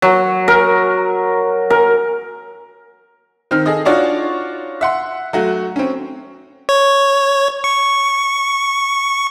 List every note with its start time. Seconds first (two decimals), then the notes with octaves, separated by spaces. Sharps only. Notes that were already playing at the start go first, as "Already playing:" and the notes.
0.02 F#3
0.48 A#4
1.70 A#4
3.51 D#3 C4 F6
3.66 G#4 A4 D#5
3.85 D4 D#4 F4 F#4 C#5 D5
4.81 E5 F#5 C6
5.33 F#3 A3 F#4
5.76 C4 C#4
6.69 C#5
7.64 C#6